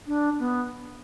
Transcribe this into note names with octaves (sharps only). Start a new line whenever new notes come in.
D4
B3